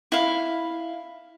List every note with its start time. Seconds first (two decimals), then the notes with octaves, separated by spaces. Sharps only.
0.12 E4 F5